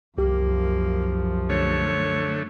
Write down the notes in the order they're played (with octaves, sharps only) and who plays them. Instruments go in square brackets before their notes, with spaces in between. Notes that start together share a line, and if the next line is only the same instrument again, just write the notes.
[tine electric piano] C2 G4 [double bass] F#2 F3 [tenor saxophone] A#3
[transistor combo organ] D3 A3 [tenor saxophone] C#5